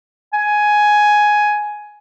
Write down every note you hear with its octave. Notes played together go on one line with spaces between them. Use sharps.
G#5